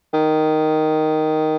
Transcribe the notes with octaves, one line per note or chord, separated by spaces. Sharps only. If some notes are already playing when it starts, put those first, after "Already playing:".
D#3